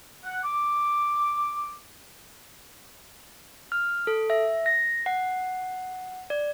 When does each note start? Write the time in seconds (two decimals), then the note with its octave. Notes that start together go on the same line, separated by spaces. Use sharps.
0.24 F#5
0.44 D6
3.72 F6
4.07 A4
4.30 E5
4.66 A#6
5.06 F#5
6.30 D5